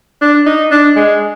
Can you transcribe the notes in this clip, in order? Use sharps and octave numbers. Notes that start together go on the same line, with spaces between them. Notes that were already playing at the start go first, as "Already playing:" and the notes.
D4
D#4
D4
G#3